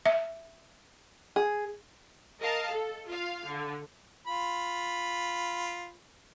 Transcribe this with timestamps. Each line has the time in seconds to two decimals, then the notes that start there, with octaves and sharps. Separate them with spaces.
0.06 E5
1.36 G#4
2.41 A#4 D#5 F5 A5
2.71 A4
3.07 F4 F5
3.45 D3
4.27 F4 B5